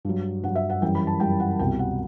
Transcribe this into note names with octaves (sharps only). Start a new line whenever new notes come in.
G2 F#3
G2 F#3 F#5
E5
F#5
F#2 E3 G3 G5
B5
A5
F#2 E3 G3 G5
F#5
C2 B2 G3 G5
F#5